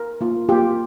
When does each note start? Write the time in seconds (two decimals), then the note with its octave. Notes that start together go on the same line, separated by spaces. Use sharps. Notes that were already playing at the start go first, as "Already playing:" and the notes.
Already playing: A#4
0.21 A#3 F4
0.49 A#3 F4 G4